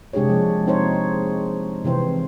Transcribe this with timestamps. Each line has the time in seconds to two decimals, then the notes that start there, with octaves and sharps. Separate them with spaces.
0.13 C3 G#3 D4 G4 G#4 C#5
0.29 F3 A#3
0.67 C4 D#4 C5 C#5
1.84 C3 E3 C4 C5